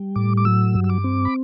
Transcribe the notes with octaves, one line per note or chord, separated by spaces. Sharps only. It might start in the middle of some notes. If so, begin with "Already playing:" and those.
Already playing: G3
A2 D6
D6
F#3 E6
G2
E6
D6
C4
B5